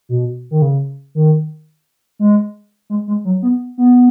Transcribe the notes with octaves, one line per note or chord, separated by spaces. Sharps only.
B2
D#3
C#3
D#3
G#3
G#3
G#3
F#3
B3
B3